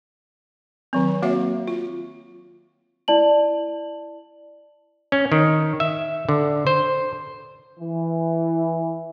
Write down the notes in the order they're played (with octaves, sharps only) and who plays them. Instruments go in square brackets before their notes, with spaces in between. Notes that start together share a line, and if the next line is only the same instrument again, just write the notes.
[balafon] D#3 F#3 C4
A#3 F#4 C#5 E5 F5
F4
[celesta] E4 D5 A5 F#7
[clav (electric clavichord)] C#4
D#3
E5
D3
C5
[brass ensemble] E3